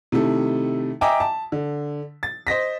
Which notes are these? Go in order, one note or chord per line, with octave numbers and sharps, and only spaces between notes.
C3 D#3 A3 E4 A4
D#5 E5 G5 G#5 A#5 D6
A5
D3
A6
C5 D#5 A#6 B6